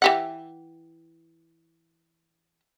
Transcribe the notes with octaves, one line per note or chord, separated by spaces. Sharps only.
E3 G4 F#5